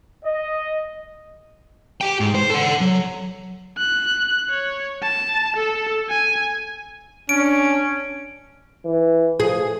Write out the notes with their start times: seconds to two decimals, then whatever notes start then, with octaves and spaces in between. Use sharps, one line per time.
0.25 D#5
2.01 G4 G5
2.20 G#2
2.35 C5
2.50 A4 F#5
2.81 F#3
3.78 F#6
4.49 C#5
5.02 A5
5.56 A4
6.10 G#5
7.29 C#4 D4 D7
8.85 E3
9.40 F3 G#4